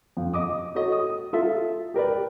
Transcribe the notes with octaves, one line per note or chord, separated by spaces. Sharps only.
F2
D#5 D6 D#6
F#4 A4 C#5 D#5
D#6
F4 A4 E5
G4 A#4 B4 D5